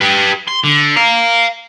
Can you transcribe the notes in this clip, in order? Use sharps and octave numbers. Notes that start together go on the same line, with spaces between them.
G4 B4
C6
D3
F5 A#5